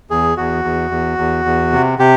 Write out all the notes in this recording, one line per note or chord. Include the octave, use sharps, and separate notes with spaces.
E2 G#4
E2 F#4
E2
E2
E2
E2
C3
C3 G4